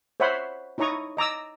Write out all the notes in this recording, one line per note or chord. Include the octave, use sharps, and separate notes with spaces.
C5 C#5 E5 F#5 B5 C6
D#4 E4 C#5 A#5 C#6 D#6
D#5 A#5 D6 E6